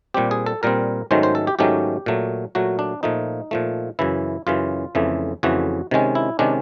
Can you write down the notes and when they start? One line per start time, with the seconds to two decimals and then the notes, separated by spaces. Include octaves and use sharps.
0.14 A#2 G3 C4 G4
0.31 G#4
0.46 A4
0.63 A#2 G3 C4 A#4
1.11 G#2 D#3 F#3 A3 C#4 C5
1.23 C5
1.35 A4
1.47 G4
1.59 G#2 D#3 F#3 A3 C#4 G4
2.06 A#2 F#3 A3
2.55 A#2 F#3 A3 F#4
2.79 D4
3.03 A#2 F3 A3 D#4
3.51 A#2 F3 A3
3.99 F#2 C#3 E3 E4
4.47 F#2 C#3 E3 F4
4.95 F2 C#3 E3 A3
5.43 F2 C#3 E3 A3 F#4
5.91 C3 D#3 G#3 C#4
6.15 E4
6.39 C3 D#3 G#3 C#4 D4